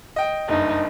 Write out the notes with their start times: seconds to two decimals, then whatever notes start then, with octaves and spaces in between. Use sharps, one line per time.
0.16 D#5 G5
0.48 F#1 G2 D#4